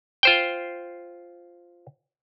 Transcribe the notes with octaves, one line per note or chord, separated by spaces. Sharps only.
F4 C5 G5